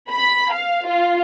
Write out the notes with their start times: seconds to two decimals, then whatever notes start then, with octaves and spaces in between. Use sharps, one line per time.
0.10 B5
0.53 F5
0.87 F4